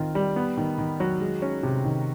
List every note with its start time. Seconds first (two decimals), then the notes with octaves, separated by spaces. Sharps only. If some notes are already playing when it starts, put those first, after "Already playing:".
Already playing: D#3 C4 F4
0.15 G3
0.36 B3
0.57 D#3
0.78 D#3
1.00 F#3
1.21 G#3
1.42 C#4
1.63 C3
1.84 D#3